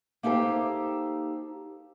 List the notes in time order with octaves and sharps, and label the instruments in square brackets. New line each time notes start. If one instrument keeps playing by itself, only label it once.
[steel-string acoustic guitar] A#3 D#4 G4 A4 C5